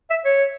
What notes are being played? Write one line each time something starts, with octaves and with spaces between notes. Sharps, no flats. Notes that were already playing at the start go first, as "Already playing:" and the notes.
E5
C#5